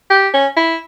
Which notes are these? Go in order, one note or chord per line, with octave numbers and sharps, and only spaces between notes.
G4
C#4
E4